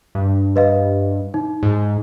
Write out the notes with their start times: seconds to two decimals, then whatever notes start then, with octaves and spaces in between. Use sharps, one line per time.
0.15 G2
0.56 B4 D#5 F5
1.34 D#4
1.63 G#2